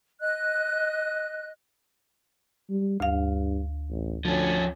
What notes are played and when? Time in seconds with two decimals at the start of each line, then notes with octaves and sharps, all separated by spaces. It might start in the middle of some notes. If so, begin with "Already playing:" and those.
0.22 D#5 F#6
2.70 G3
3.00 D2 G2 F5
3.90 A1
4.25 D2 F3 C#4